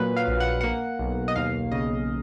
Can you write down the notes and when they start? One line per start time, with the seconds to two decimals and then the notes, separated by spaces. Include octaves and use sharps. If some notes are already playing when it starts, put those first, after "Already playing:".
Already playing: A#2 F#3 B4
0.16 F5
0.28 A#1
0.40 F#5
0.61 A#3 F#5
0.99 B1
1.28 D#5
1.36 D#2 F5
1.71 C#3 D#5